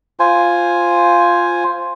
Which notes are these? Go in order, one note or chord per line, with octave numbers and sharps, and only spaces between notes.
F4 C5 G#5